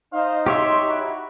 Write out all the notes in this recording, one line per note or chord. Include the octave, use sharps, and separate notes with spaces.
D#4 C5 D#5 F5
G4 C#5 E5 C6
E4 F#4